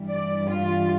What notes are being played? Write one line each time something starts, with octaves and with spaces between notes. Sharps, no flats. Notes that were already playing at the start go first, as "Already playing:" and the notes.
Already playing: G2 E3 G3
D5
F4